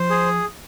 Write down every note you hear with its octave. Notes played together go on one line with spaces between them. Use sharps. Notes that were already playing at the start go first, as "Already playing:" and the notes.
Already playing: F3 C5
G#4